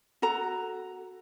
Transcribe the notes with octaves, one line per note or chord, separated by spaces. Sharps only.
F#4 A4 A#5